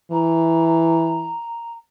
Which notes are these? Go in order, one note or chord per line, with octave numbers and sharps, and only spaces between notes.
E3 A#5